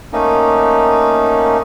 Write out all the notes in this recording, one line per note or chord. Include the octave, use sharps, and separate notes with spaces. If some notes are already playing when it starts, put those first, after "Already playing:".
A3 A#3 C#4 D#4